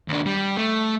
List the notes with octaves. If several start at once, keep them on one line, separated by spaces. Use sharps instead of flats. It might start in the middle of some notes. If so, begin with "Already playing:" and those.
D#2 D4
G3
A3